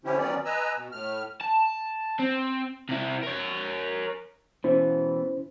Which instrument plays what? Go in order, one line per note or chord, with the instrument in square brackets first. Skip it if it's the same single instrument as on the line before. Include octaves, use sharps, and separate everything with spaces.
[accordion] D3 F3 C#4 E4 G4
D#3 F#3 B3 C#4 D5
B4 D#5 G#5 A#5 E6
B2
A2 F6
[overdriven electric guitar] A5
C4
C3 E4
A#4 C#5
[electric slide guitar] B2 E3 [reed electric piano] C#4 E4 C5